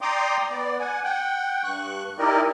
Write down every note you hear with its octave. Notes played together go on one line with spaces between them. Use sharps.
D5 G5 A#5 C6 D6 D#6
B3 D5
F#5 G#5
F#5 G5
G2 C#6 F#6
D#4 E4 G4 A#4 D5 D#5